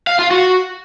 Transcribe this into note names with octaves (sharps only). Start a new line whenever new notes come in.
F5
F4
F#4